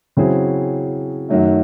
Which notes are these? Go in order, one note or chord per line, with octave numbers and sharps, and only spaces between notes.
C#3 F#3 C4 E4 G#4
F#2 D#3 F#3 A3